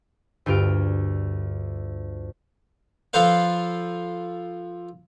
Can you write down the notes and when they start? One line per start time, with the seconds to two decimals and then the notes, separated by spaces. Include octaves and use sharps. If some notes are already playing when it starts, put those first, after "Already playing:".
0.46 D2 G2 F4 F6 D7
3.13 F3 F4 A4 B4 C5 F5